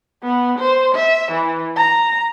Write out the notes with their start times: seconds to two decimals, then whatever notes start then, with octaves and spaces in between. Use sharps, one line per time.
0.22 B3
0.59 C5
0.95 E5
1.32 E3
1.76 A#5